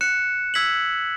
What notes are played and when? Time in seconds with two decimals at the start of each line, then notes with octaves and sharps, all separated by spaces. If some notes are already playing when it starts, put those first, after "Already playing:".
0.01 F#6 C#7 E7
0.54 E6 G#6 B6 F#7